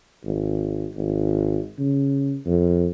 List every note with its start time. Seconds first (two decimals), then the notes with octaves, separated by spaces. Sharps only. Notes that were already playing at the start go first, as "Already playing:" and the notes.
0.24 G#1
0.95 G#1
1.79 C#3
2.46 F2